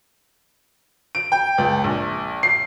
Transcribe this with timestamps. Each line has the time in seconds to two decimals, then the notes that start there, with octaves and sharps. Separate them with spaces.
1.15 D7
1.32 G5
1.58 C#2
1.84 A#1
2.43 C7